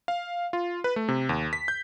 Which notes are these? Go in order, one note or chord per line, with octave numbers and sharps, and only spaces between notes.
F5
F4
B4
A3
C3
D#2
B6
G6